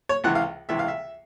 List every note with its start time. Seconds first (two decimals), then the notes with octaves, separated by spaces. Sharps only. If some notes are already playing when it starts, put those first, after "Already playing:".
0.09 C#5
0.24 C#2 C3 E3 F#5
0.35 F5
0.69 C#2 C3 E3 E5
0.79 F5
0.88 E5